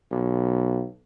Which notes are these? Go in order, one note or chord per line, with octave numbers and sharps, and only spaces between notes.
B1